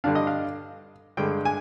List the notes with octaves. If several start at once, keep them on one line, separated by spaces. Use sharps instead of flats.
G2 D3 G3 D4 F5
D#5
F5
G2 D3 G#3 G5
G#5